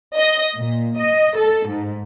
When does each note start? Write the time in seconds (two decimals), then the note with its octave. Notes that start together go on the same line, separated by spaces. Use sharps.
0.17 D#5
0.56 A#2
0.98 D#5
1.36 A4
1.67 G#2